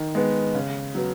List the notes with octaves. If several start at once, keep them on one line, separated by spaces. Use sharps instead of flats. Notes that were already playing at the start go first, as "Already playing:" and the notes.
Already playing: D#3
G#3 B3
C#3
F#3 B3